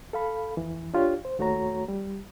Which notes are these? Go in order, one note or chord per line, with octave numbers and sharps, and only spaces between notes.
A4 F5 B5
F2 E3
D4 F4 G4 C#5
C5
D#2 A3 F#4 C#5 A#5
G3